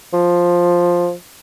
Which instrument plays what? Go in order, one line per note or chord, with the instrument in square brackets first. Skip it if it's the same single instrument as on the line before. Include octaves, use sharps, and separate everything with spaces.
[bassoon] F3